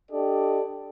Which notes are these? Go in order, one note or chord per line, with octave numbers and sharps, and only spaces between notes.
D4 G4 A4 D5 D#5